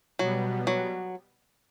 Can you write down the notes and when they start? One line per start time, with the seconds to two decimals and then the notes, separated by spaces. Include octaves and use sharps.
0.19 B2 F#3 G3 B3
0.67 F#3